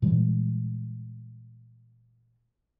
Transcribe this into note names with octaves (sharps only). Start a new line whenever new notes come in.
A#2 E3 G3 G#3